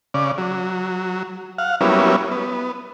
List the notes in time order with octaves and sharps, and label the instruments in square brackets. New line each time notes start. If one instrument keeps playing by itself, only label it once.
[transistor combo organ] C#3 D5
F#3
F5 F#5
F#3 G3 A#3 B3 C#4 E4
B3